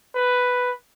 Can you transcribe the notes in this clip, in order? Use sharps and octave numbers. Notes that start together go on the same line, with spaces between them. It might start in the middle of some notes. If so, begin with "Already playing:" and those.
B4